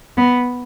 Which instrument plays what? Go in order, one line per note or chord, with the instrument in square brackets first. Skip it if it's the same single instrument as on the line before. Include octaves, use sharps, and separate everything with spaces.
[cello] B3